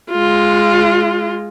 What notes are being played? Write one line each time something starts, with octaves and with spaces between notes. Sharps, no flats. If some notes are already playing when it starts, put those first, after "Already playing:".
G#3 F4